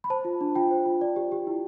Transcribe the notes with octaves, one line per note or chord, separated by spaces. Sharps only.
B5
C5 A5
F4
D4
F4 G5
C5
F4
D5
G4
G4
E4